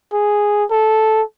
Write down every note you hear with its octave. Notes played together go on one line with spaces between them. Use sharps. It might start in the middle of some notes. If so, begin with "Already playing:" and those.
G#4
A4